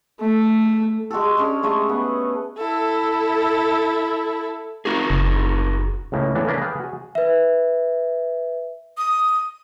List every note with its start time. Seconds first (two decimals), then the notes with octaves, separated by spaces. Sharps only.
0.20 A3
1.10 G#3 F#4 G4 A4
1.37 G#3 C#4 D4
1.63 A3 G#4 C#5 D#5
1.89 B3
2.57 E4 A4
4.85 D#4 F#4 G#4
5.10 F#1
6.12 C#2 A2 C#3 A#3
6.35 A2 C#3 E3 B3 D4
6.47 A#3 C#4 D4 G#4 A#4 B4
6.61 G#4 B4 F5 G5 A5
6.80 F#4 G#4
7.15 B4 E5
8.98 D#6